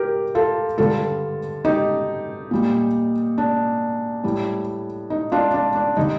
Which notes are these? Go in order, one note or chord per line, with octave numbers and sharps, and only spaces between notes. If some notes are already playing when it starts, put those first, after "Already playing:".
Already playing: G4 A#4
F4 A4
G2 D3 G3 F4 A4
D#4 G4
A#2 G3
D4
A2 G3
D#4
D4 F4
D4
D4
D3 G3 D#4